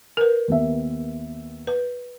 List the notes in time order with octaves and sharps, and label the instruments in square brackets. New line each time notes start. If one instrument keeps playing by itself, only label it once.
[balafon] A#4 B4
[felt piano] D#2 B3 E5
[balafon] B4